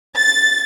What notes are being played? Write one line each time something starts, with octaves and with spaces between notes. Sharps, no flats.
A6